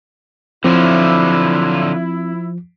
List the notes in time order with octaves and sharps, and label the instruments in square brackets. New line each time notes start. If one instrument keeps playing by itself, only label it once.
[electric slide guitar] D3 F#3 F4 [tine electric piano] F3 [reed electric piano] C4 [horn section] E4